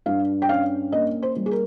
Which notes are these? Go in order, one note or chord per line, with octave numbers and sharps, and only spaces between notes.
G2 F5
G5
C#4 F5
A#3 D#5
C5
G3
G#4
A#4